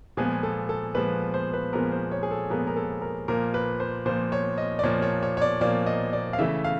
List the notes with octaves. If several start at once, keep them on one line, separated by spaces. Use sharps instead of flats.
A#2 F3 G#3 B3 G#4
A4
A4
A#2 F3 G#3 B3 B4
C5
B4
A#2 F3 G#3 B3 A#4
C5
C#5
G#4
A4
A#2 F3 G#3 B3 A#4
A#4
A4
A#4
A#2 F3 A#3 A#4
B4
C5
A#2 F3 A#3 C5
C#5
D#5
D5
A#2 F3 A#3 C#5
C#5
C#5
C#5
D5
A#2 F3 A#3 D5
D#5
D5
F5
C#3 E3 A3 E5
F5